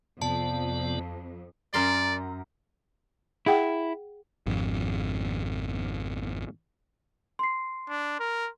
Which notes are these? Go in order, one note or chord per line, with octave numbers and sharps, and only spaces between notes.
F2 C3 B3 D5 A5
F#2 A#4 D5 C6
E4 G#4 F#5 G5
G#1 F2
C6 C7
D4
A#4